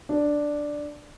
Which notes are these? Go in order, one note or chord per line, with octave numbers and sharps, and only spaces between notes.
D4